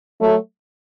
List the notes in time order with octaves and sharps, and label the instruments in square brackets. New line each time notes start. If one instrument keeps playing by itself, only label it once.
[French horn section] F#3 A3